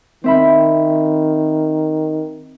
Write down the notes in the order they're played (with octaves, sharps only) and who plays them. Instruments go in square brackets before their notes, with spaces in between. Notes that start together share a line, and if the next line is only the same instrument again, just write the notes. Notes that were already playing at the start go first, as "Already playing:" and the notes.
[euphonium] D#3 [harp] C4 E5 B5